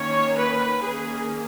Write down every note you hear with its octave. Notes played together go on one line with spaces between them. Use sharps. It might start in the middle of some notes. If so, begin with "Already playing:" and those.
Already playing: D#3 A#3 C#4 C#5
B4
D#3 A#3 C#4 G#4